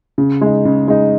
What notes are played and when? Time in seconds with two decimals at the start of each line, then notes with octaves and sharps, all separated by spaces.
0.18 C#3
0.41 G#3 D#4
0.65 C#3
0.88 G#3 D#4